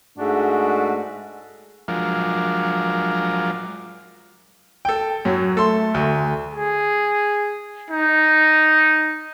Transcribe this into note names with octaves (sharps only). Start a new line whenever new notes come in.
G#2 G#3 A3 D4 F#4
F3 F#3 G#3 D4 F4 A#4
A4 G5
F#2 F#3
A3 A4 C6
D2
G#4
D#4